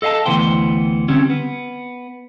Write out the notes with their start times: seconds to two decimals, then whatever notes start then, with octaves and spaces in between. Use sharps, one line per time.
0.02 A4 D#5 F5 G5 A5
0.26 D2 C#3 E3 B3 C5 G5
1.08 D3 G3 C4 C#4
1.30 B3